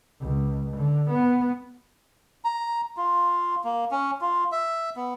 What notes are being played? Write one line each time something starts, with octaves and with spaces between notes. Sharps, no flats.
C#2
D3
B3
A#5
F4
A#3
C#4
F4
E5
B3